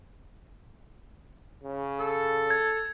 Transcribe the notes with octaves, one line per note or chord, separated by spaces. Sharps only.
C#3
A4
G#6